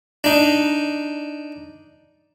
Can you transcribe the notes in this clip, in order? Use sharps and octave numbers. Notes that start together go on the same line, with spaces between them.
D4 D#4